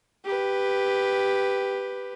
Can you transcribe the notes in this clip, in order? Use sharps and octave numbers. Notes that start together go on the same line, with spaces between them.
G4 B4